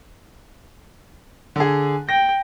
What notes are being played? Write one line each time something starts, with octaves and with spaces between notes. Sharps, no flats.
D3 G#4
G5 A#6